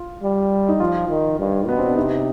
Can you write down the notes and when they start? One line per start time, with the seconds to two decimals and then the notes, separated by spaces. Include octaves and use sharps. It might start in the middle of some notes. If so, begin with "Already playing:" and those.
Already playing: F4
0.22 G3
0.69 D#4
0.80 F3 F4
1.09 D#3
1.38 G2
1.67 B2 B3
1.79 C4
1.87 D4
1.96 C3 D#4